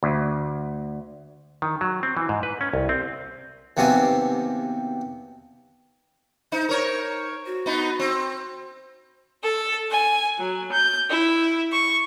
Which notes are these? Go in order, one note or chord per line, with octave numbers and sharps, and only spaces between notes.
D2
D#3
F#3
C4
E3
G#2
B4
C#4
C2
C4
D#2 C3 F#3 B3 C4 G#5
D#4 C5
A#4 C#5
F#4
B3 D#4
C4
A4
G#5
F#3
G6
E4
C#6